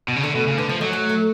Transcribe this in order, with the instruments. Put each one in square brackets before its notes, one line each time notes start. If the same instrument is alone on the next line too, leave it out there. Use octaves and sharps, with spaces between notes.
[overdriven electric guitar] B2
C#3
[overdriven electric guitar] D3 [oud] A3
[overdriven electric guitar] B2
C#3
[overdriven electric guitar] D3 [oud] B3
[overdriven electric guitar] F3 [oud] A3
[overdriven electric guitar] F#3 [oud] G#3
[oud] A3
A3